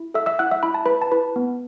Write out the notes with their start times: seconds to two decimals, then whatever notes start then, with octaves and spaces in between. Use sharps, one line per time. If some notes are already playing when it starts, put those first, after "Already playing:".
Already playing: E4
0.14 A4 E5 E6
0.26 E5 E6
0.39 E4 F#5 F#6
0.51 E5 E6
0.63 E4 B5
0.74 A5
0.86 E4 B4 B5
1.02 A5
1.12 E4 B4 B5
1.36 B3